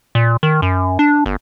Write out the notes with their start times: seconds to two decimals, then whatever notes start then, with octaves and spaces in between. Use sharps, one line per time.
0.15 A#2
0.43 D#3
0.62 F#2
0.99 D4
1.26 G1